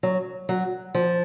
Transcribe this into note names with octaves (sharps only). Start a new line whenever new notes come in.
F#3
F#3
F3